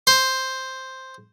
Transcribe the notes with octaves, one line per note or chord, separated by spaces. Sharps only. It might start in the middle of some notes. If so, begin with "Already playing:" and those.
C5